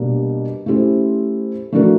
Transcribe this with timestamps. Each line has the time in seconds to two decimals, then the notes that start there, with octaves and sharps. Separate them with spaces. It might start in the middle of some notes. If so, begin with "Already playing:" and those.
Already playing: B2 G3 A#3 D4 G4
0.66 A3 C#4 E4 G4 C5
1.72 E3 A3 D4 F#4 A#4